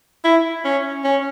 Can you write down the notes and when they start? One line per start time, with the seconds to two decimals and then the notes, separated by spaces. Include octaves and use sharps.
0.24 E4
0.65 C#4
1.04 C#4